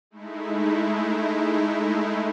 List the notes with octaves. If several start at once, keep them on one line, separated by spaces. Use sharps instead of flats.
G#3 A3 D#4 E4